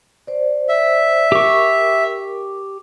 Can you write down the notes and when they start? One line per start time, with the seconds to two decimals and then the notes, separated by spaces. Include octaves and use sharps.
0.27 C5 D5
0.69 E5
1.32 G4 A#4 C#6